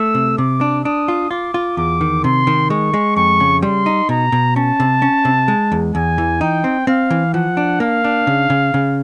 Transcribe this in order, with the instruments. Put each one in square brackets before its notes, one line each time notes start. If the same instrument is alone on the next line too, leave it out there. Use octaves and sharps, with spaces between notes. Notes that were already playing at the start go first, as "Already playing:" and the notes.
Already playing: [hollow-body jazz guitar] A3 [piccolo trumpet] E6
[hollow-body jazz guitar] C3
[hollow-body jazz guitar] C3 [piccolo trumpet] D6
[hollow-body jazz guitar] D4
[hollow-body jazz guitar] D4 [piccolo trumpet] D#6
[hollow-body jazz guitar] F4
[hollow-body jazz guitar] F4 [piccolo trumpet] D6
[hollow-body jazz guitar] F4
[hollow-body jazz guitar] E2 [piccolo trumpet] D6
[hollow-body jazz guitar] D#3
[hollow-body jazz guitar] C3 [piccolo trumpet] C6
[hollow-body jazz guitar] D#3
[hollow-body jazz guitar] G#3 [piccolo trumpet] C#6
[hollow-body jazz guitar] G#3
[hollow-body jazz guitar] F2 [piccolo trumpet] C#6
[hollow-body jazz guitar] C#3
[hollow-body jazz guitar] G3 [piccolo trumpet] C6
[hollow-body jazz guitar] D#4
[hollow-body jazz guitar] B2 [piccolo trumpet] A#5
[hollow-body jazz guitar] B2
[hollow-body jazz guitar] C#4 [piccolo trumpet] A5
[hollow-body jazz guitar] C3
C#4
C3
G#3
E2
[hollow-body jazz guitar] E2 [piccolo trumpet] G#5
[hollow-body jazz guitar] E3
[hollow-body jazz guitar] D#4 [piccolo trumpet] G5
[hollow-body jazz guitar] C4
[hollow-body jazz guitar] C4 [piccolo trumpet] F5
[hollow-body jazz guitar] E3
[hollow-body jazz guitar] F3 [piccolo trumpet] F#5
[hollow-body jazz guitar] D4
[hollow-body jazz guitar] A#3 [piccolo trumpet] F5
[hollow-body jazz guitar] D4
C#3
C#3
C#3